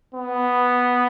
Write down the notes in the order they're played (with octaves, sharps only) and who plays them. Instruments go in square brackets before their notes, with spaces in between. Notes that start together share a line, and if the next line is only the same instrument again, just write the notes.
[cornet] B3